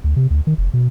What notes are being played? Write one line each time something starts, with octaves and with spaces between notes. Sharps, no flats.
D2
C3
D2
D#3
F1
B2